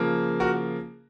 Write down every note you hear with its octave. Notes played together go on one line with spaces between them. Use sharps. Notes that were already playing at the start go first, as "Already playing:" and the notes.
Already playing: C#3 F3 A#3
F#4 A#4